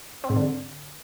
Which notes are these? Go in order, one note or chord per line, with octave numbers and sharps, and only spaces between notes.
C4
G#2
D3